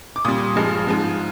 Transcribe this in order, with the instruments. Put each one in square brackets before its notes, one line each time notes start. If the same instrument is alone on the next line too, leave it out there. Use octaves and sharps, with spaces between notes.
[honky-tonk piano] D6
A#2 G3 D#6
G2 F3 G#3
G#2 F3 G#3